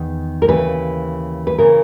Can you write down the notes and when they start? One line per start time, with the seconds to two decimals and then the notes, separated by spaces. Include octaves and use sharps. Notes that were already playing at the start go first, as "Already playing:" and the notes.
Already playing: E2 D#3
0.42 A#4
0.48 D#2 C#3 E3 B4
1.47 B4
1.58 C#3 E3 A#4